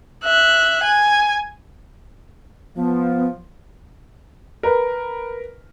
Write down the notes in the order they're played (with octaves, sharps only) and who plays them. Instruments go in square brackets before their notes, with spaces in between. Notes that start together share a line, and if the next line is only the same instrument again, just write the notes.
[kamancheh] E5 F#6
G#5
[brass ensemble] F3 [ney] B3
[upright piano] A#4 B4